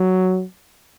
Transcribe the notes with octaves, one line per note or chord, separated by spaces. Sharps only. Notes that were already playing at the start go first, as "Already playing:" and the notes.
Already playing: F#3